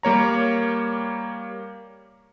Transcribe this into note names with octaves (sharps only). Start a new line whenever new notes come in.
G3 A#3 C#5 A#5